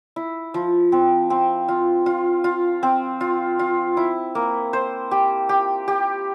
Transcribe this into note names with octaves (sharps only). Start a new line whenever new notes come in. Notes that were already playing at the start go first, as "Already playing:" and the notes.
E4
F3
C4
C4
F4
F4
F4
C4
F4
F4
E4
A#3
C5
G4
G4
G4